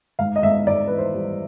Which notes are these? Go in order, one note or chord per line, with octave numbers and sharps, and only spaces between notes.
G#2 F5
D#5
G#2 E5
G#2 D5
E3 B4
C5
G3